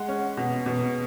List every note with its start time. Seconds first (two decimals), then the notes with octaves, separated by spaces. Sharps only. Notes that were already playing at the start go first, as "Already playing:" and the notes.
Already playing: G#3 F#5
0.08 C#4
0.37 B2
0.66 B2